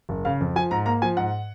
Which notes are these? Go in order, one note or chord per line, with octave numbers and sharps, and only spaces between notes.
F#1
C#3 F5
F2
F3 G#5
G#2 A#5
A#3 A#5
F3 G#5
G#2 F#5